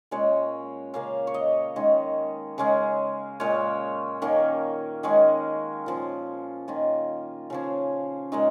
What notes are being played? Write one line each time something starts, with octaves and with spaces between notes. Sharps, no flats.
A#2 G#3 C#4 C#5
C#3 A#3 C#4 F5
C#5
D#5
D#3 G#3 C#4
C#3 G#3 C#4
A#2 G#3 C#4 C#5
D#3 A#3 C#4
D#3 G#3 C#4 G#4
A#2 F3 C#4
D#3 A#3 C#4 F4
C#3 F3 C#4
A#2 G#3 C#4 D#4